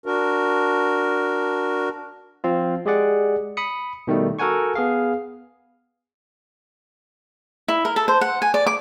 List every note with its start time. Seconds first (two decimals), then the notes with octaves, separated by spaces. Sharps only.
0.06 D4 F#4 A#4
2.44 F3 C4 F4
2.86 G#3 G4 G#4 D5 F#5
3.57 B5 D#6 C#7
4.07 B2 D#3 G3 A3
4.39 F#4 A4 A#4 F#5 G#5 C#6
4.75 B3 G#4 F5
7.68 E4
7.85 A#4
7.96 A4
8.08 C5
8.21 F#5
8.42 G#5
8.54 D5
8.66 D6